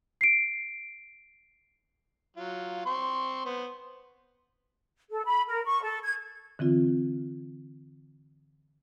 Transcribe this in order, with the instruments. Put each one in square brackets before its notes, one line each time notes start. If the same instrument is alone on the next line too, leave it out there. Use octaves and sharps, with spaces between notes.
[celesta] C7 D7
[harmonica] F#3 F4
C4 C6 C#6
B3 C5
[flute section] A4
B5
A#4
C#6
A4
G#6
[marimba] D3 E3 C4 F4